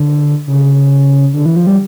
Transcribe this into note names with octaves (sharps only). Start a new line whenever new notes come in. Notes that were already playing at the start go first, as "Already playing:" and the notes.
Already playing: D3
C#3
D3
E3
F3
G3